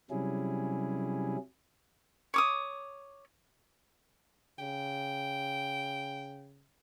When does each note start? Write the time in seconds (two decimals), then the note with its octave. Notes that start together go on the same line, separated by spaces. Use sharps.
0.10 C3 F#3 G3 C#4 E4 G#4
2.34 C#5 D6 D#6
4.59 C#3 G5